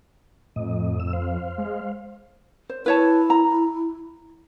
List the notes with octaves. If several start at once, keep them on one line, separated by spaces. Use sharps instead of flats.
F2 A2 D#5
E6
C5 F5
G#3
C5
E4 B4 C#5 A5
A#5